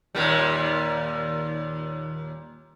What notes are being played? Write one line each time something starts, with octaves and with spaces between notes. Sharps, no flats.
D#2 A#2 G3